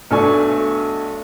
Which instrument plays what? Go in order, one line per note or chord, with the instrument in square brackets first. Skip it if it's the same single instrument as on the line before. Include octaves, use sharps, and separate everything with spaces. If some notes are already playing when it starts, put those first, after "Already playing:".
[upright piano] B1 A3 D4 A4 G#5 C#6